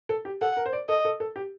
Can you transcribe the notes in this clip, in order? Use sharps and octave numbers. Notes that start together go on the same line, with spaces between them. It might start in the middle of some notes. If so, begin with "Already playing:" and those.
A4
G4
A4 F#5
A#4
C5
D5
A4 D#5
A4
A4
G4